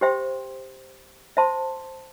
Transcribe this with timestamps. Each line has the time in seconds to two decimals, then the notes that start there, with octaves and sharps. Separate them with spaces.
0.01 G4 C5 E5 G5 C6
1.37 C5 E5 A5 C6